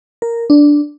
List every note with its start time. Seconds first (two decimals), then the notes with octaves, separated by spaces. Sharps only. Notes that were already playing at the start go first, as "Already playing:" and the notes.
0.22 A#4
0.50 D4